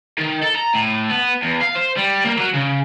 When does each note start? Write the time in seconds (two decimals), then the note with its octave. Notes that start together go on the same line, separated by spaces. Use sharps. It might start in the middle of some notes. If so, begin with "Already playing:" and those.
0.18 D#3
0.42 A4
0.55 A#5
0.74 A2
1.10 B3
1.43 E2
1.62 F5
1.76 C5
1.97 G3
2.24 A#3
2.38 F#3
2.53 C#3